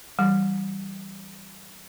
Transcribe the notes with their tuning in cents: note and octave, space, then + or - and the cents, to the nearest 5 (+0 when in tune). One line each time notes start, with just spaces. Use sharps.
E3 +0 G3 -10